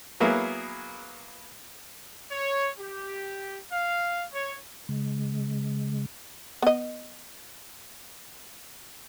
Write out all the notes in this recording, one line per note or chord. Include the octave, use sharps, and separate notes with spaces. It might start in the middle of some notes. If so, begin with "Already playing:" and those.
F#3 A#3 B3 E4 G#4
C#5
G4
F5
C#5
C#3 G#3
B3 D#5